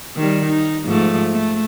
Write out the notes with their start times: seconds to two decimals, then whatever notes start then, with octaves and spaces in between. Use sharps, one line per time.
0.16 D#3 G3
0.46 D#4
0.86 G#2 F3 A3
1.33 A3